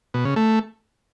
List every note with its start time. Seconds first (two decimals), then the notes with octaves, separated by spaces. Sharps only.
0.14 B2
0.25 C#3
0.36 A3